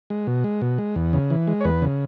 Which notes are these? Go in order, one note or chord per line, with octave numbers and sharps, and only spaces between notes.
G#3
B2
G#3
B2
G#3
E2
C#3
E3
G#3
C#5
E2 B4
C#3